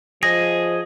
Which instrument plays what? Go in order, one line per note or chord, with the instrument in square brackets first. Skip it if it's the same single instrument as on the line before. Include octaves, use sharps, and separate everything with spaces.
[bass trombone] F3 [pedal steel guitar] G#4 D#5 [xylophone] A#6